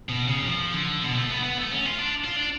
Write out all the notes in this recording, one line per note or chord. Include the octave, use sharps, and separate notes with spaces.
B2
C#3
F#3
F3
D3
B2
A3
B3
B3
A3
C#4
F4
D4
F4
D4